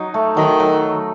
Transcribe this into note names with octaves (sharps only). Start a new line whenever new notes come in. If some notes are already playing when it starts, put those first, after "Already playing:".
Already playing: F#3 D#4
A3
D#3 F#3
F#3